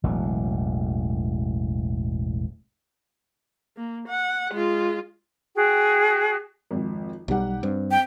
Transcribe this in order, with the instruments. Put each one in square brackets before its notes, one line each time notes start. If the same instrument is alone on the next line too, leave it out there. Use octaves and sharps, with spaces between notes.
[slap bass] E1 A1 F#3
[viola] A#3
F#5
G#3 F4
[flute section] F#4 G#4 G5
[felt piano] G#1 F2 F3
[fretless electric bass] B1 G3 [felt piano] D#4 G4 F#5
[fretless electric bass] G2 [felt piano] C4
[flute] G5